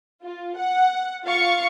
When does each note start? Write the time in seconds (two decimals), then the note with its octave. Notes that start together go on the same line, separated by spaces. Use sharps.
0.22 F4
0.57 F#5
1.23 F4 F5 C#6